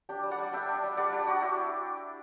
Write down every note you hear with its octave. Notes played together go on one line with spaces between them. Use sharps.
D4 G4
G3
D5 F#5
G3
D4 E5 G5
D4
G3
G3 D5 F#5
D4 G4
D4 F#4
E4 G4